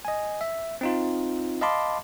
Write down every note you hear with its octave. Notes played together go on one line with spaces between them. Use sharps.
D#5 G#5
E5
C4 D#4 F4
D#5 F5 A5 B5 C6 D6